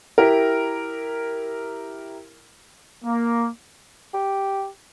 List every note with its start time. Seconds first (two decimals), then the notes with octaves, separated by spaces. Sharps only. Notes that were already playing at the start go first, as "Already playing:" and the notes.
0.18 E4 G4 A#4
3.05 A#3
4.14 G4